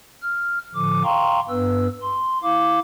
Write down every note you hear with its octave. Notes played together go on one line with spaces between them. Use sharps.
F6
A2 D3 F3 D6
F5 G5 A#5 C6 C#6
G2 B3 B4 E6
C6
E4 F5 D6